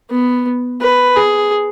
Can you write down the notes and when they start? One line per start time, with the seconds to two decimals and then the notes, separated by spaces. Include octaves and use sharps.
0.10 B3
0.81 B4
1.16 G#4